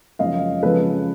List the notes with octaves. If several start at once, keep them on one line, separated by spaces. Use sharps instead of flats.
F#2 C#3 F3 G#3 D#5 F5
F2 C#3 F3 G#3 A4 B4